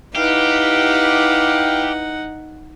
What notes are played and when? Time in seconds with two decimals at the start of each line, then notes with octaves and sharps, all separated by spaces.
0.15 D#4 E4 G4 B4 F5 F#5